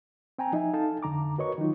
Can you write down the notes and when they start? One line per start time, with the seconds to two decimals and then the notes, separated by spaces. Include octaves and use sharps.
0.38 C4 G5 G#5 A#5
0.52 F3 D#4 D#5 E5 G#5
0.73 D#4 A4 F5 A5
1.03 F2 D3 A#5 D6
1.38 F#4 A#4 B4 C#5 D#5 C#6
1.58 D#3 F#3 D#4 F4